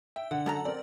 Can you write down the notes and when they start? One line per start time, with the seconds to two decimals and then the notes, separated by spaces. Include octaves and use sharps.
0.16 E5 G5
0.31 D3 F#5
0.46 F#2 A4 A#5
0.65 C4 A#4 D5